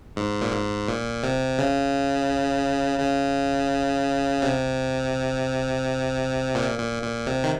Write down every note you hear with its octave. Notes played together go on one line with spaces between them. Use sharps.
G#2
A#2
G#2
A#2
C3
C#3
C#3
C3
A#2
A#2
A#2
C3
D#3